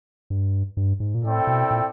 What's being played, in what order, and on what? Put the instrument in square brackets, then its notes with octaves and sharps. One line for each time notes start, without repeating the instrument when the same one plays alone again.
[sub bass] G2
G2
G#2
A#2
[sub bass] A2 [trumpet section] C4 E4 A4 D5 G5
[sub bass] B2
A#2